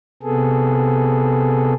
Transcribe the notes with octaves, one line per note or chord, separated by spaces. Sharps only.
C3 B3 G#4 A4